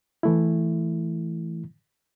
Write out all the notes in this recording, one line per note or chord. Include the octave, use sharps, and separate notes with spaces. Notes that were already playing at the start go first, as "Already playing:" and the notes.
E3 A3 E4